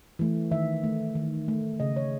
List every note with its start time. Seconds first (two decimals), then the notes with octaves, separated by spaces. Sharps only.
0.19 E3 A3
0.51 D#3 E5
0.84 A3
1.15 D#3
1.48 A3
1.80 C#3 D#5
1.96 C#5